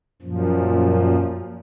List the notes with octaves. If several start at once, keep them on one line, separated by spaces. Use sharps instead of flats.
F#2 A#2 F3